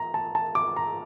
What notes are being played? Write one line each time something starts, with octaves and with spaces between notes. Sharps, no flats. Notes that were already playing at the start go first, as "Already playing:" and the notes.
Already playing: A#5
A5
A5
D6
A#5